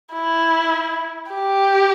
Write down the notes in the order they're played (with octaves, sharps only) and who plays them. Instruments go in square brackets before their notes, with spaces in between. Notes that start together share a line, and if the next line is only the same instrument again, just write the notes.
[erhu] E4
G4